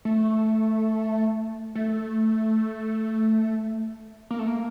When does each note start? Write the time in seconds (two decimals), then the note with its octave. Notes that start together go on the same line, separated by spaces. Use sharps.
0.05 A3
1.75 A3
4.31 A#3
4.39 A3
4.47 A#3